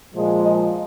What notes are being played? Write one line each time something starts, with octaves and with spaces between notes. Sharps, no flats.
A#2 F3 G#3
D#5